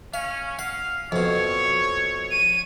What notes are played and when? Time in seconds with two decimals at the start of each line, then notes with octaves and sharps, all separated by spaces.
0.14 C#4 F5
0.59 F5 F#5
1.12 F2 B2 C#5
2.32 D#7